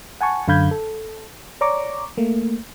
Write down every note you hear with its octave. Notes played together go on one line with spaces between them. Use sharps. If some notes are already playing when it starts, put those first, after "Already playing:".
F#5 G#5 A5 C#6
F#2 D3 F5 B5 G6 G#6
A4
C#5 D5 A#5 C#6 D6
A3 A#3